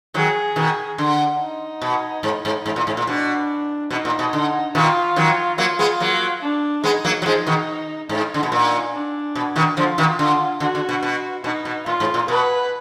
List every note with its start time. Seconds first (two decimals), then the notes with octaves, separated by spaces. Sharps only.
0.14 D#3 F#3 G#4
0.56 B2 D#3
0.98 D3
1.39 D#4
1.82 B2
2.23 G#2
2.45 G#2
2.66 G#2
2.76 A#2
2.87 G#2
2.97 A#2
3.07 B2 D4
3.91 B2 D#4
4.05 A#2
4.19 B2
4.33 D3
4.75 B2 D#3 F4
5.16 D#3 F#3
5.58 F#3 A#3 F4
5.79 G#3 B3
6.00 F#3 A#3
6.42 D4
6.84 G#3 B3 D#4
7.05 F#3 A#3
7.22 F#3
7.25 F3 G#3 D#4
7.47 B2 D#3
8.09 G#2 D#4
8.34 D3
8.43 B2
8.52 A#2
8.94 D4
9.36 B2
9.56 B2 D#3
9.77 D3 F3 F4
9.98 B2 D#3
10.19 D3
10.60 D3 F#4
10.75 D3
10.89 B2
11.03 B2
11.44 B2 D#4
11.65 B2
11.86 A#2 F4
12.00 G#2
12.14 A#2
12.28 B2 B4